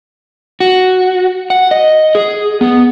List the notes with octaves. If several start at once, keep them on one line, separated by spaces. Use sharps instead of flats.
F#4
F#5
D#5
G#4
B3